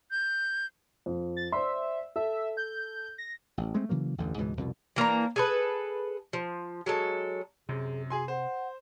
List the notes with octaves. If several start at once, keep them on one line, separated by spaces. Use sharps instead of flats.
G6
F2
A6
C5 D5 E5 C6
A4 E5
G6
A#6
A1
G#3 A3 C4
C#3 E3 F#3 A#3
A1 E2 G2 D3
C#2 G#2 B2 E3
C2 F2 B2
E3 A#3 D4 A#5
G#4 A4 B4
F3
F#3 G#3 A4
F#2 C3 G#4
F#4 G#4 G#5 C6
C5 F#5